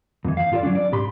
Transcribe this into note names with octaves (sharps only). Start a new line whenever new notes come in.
F2 E3
F5
G2 F4 A4 D5
F#3 G#3 C#4 D4
D5
B1 G#2 G4 B5 C6